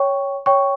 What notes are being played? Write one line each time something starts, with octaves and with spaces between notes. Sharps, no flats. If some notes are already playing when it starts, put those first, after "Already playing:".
Already playing: C#5 G5 C#6
C#5 G5 C#6